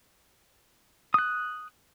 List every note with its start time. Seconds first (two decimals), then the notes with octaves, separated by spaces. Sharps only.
1.14 D#6 F#6